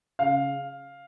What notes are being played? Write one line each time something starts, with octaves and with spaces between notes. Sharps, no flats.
C#3 F5